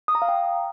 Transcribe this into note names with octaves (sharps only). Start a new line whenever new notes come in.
D#6
A#5
F5
G5